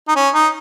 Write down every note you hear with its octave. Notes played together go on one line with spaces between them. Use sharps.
D#4
C#4
D#4